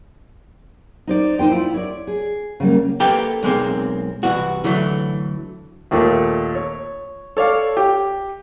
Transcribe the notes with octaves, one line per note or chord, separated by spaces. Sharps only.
D#4 C5 D5
D#4 C5 G5
E4 F4
C#5 D5
G#4
C#3 G3 A#3
A#3 G4 A4 B4 G5
B1 G#3 A#3 C4
C2 E3 F#4
D3 E3 F#3 A3
D#2 A#2 A3
C#5
A4 C#5 D5 F5
G4